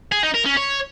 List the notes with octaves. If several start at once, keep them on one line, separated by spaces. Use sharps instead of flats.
G#4
D#4
A#4
C#4
C#5